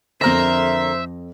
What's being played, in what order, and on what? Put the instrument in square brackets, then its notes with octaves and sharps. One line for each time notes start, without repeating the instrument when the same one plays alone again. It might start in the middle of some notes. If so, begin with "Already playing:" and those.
[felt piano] F2 A#6 [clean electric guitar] D3 A#4 [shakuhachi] C5 [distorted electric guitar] E5